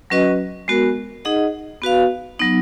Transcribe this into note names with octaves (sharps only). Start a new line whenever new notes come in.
F#3 C#4 F#4 B4 D#5
G#3 B3 F#4 A#4
D#4 G#4 D#5 F#5
B3 F#4 B4 F5
F#3 B3 D#4